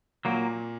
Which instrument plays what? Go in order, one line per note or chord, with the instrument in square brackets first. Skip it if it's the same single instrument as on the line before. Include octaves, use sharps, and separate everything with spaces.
[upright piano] A#2 [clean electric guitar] F#3 A#3